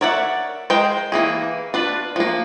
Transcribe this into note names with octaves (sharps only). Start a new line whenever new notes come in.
A#4 C#5 D5 E5 F#5
G#3 A#4 C5 G5
E3 A#3 G#4
D4 F4 B4
F3 A#3